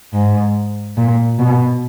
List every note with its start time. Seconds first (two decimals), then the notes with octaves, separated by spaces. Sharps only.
0.13 G#2
0.97 A#2
1.39 B2